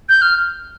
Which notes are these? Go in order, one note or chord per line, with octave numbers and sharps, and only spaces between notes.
G6
F6